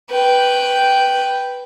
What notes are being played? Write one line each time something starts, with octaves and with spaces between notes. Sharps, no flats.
B4 G5